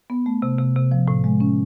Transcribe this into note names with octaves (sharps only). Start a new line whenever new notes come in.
B3
A3
C3
C3
C3
F3
A2
G#3
C#4